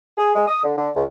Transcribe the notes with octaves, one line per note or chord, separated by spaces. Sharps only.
G#4
G#3
D#6
D3
D3
C#2